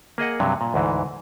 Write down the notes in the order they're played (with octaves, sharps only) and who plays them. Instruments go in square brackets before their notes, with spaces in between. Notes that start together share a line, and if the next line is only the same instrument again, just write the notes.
[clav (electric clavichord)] A#3 G#4 D#5 F#5
G2 C3 F#3
A#2
D2 G#2 E3